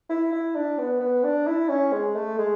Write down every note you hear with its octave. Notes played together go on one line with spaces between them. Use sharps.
E4
E4
D4
B3
B3
D4
E4
C#4
G#3
A3
G#3